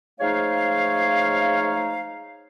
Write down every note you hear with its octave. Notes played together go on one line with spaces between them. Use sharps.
F3 G#3 A3 D#4 C#5 F5